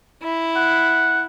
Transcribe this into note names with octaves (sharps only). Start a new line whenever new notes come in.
E4
F#5